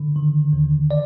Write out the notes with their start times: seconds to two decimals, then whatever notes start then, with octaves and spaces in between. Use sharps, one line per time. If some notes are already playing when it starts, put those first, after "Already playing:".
Already playing: D3
0.16 D#3
0.53 D#2
0.91 D5